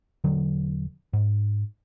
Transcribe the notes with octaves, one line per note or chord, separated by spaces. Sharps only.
E1 D3 F#3
G#2